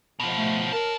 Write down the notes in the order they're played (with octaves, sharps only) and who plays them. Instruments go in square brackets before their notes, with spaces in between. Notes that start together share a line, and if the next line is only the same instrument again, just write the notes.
[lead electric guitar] B2 F3
[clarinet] A3
[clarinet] A#4 [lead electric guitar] C#5 A5